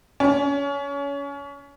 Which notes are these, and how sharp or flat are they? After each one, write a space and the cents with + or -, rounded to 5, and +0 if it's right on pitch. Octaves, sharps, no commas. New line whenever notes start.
C#4 +30